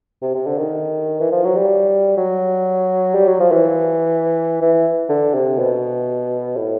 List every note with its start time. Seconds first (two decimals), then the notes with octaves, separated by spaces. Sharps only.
0.22 C3
0.35 C3
0.47 D3
0.58 D#3
1.20 E3
1.32 F3
1.45 F#3
1.56 G3
2.17 F#3
3.15 G3
3.27 F#3
3.40 F3
3.52 E3
4.62 E3
5.09 D3
5.34 C3
5.59 B2
6.57 A2